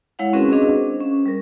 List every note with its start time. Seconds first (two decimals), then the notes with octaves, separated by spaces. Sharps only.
0.19 G#3 E4 C#5 F5 F#5
0.33 C4 C#4 F#4 G#4 A#4 B4
0.51 C4 D4 G#4 D#5 F5
0.75 C5
1.01 C#4
1.26 G3 A#4